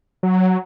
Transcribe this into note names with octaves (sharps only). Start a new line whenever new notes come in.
F#3